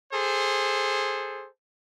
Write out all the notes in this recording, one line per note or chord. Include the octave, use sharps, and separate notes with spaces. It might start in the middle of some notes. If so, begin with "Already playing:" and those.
G#4 A4 C5